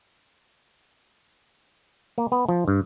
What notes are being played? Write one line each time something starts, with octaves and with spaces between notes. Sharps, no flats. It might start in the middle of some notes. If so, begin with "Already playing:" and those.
A#3
B3
F3
G2